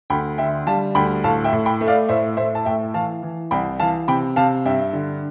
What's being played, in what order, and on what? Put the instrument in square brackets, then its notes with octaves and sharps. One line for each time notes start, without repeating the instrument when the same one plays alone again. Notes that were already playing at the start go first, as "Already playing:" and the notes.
[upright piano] D2 G5 B5
D3 E5 G5
G3 F5 A5
D2 G5 B5
A2 F5 A5
E5 G5
A2
G5 B5
A3
D5 F5
A2 C5 E5
A2 C5 E5
A5
A2 E5 G5
E3 F5 A5
E3
C2 G5 B5
E3 F5 A5
C3 G5 B5
C3 F5 A5
G2 E5 G5
D3